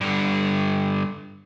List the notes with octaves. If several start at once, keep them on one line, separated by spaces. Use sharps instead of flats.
G2 D3